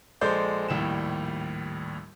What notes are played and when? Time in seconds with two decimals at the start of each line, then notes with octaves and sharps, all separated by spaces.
0.21 A#1 G#3 A4 C5 D5 G6
0.69 A#1 D#2 A2 G3 G5 E7